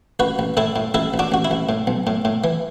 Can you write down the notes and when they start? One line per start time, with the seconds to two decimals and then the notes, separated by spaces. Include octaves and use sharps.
0.19 A1 F#4 B4
0.39 A1
0.57 A2 E4 A4
0.76 A2
0.94 A1 E4 A4
1.14 A1
1.19 D4 F#4
1.32 A1 F#4
1.45 E4
1.51 A1
1.69 A2
1.87 B1
2.07 A2
2.25 A2
2.44 E3